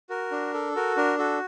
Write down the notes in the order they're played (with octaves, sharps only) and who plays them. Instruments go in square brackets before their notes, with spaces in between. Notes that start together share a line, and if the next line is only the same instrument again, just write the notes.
[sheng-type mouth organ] F#4 A#4
D4
A4
F#4 A#4
D4 A#4
F#4 A4